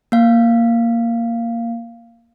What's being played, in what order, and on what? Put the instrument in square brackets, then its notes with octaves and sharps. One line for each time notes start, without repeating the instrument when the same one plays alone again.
[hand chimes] A#3 F5